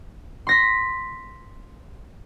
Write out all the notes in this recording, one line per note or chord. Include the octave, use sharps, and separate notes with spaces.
C6 A#6 B6